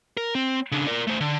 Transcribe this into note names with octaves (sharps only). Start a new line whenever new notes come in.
A#4
C4
C#3 D4
A#4 D5
A3 C5
D3